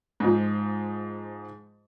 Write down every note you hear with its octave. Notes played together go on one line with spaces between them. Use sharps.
G#2 F3